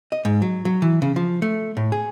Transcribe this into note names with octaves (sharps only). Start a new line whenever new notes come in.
D#5
G#2
F#3
F#3
E3
C#3
F3
A3
A2
G#4